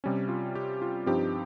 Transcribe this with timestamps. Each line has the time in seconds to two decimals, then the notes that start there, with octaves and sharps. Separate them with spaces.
0.04 C3 G3 C#4
0.29 F4
0.55 G4
0.82 F4
1.06 G2 F3 C4 D#4 G4